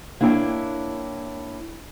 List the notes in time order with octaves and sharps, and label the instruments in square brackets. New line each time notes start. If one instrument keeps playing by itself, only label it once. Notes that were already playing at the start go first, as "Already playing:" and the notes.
[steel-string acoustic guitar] A#3 D4 E4 C#5 G5